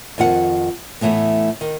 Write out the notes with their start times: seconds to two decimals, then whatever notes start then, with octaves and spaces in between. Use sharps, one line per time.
0.18 F2 D#3 F4 F#5
1.01 A2 E3 F3 A3 B3
1.61 D#3